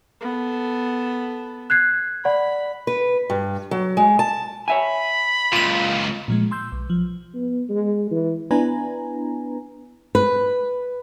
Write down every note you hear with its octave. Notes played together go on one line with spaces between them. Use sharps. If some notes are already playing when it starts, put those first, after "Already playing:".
B3 A4
F#6 G#6 C7
D5 F#5 B5
B4
G2
F#3
G#3
A5
C#5 E5 G#5 B5
C#2 A#2 F4 D#7
A#2 F3 G#3
C6 E6 G6
B1
F3
B3
G#3
E3
B3 D4 E4 B4 G#5 A#5
B4